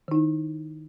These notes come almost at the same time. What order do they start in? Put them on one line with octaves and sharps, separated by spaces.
D#3 D#4 E4